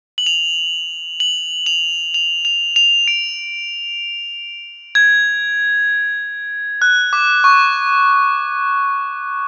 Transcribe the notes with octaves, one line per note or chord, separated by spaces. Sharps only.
F#7
F7
F#7
F7
F7
F7
F7
D7
G#6
F#6
D6
C#6